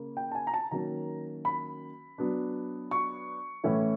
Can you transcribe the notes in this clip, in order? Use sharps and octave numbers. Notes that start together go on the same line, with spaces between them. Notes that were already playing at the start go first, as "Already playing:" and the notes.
Already playing: C#3 A#3
G5
A5
G#5
A#5
A5
D#3 F#3 A#3 C#4 A#5
B5
F#3 B3 D4
C#6
A2 E3 A3 C#4 E4